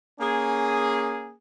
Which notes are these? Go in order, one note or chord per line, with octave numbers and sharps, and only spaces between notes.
A#3 C#4 G#4